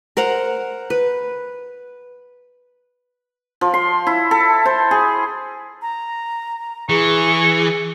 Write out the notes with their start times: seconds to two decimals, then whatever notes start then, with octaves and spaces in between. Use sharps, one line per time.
0.17 A#4 C5 F#5 A#5
0.90 B4
3.61 F3
3.74 C6
4.07 E4
4.31 A4
4.65 C5
4.91 G#4
5.82 A#5
6.89 E3 G#4 C#6